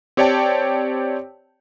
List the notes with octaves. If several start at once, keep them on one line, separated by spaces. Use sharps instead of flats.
C4 G4 C#5 D5 G5 A5